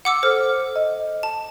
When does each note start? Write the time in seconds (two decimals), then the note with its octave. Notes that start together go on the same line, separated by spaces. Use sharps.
0.05 F#5 D6 E6
0.23 A4 C5 F6
0.76 D#5
1.23 A5